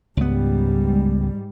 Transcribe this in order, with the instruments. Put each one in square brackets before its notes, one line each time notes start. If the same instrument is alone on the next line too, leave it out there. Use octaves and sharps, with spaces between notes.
[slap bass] C#2 B3 [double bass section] G#2 G3